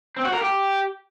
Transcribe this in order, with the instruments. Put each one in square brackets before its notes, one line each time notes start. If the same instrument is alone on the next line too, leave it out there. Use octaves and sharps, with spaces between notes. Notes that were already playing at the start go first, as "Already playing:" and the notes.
[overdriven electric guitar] C4
F#4
A#4
G4